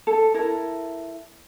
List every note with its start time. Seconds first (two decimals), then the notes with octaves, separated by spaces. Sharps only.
0.07 A4
0.34 E4 A4 A#4